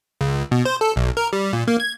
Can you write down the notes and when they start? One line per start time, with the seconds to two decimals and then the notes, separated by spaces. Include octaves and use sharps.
0.21 C#2
0.51 B2
0.65 C5
0.81 A4
0.96 B1
1.17 A#4
1.33 G3
1.53 A#2
1.68 A#3
1.80 G#6